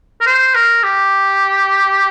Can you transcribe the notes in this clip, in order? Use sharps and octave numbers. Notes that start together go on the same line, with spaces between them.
A#4
C5
A#4
G4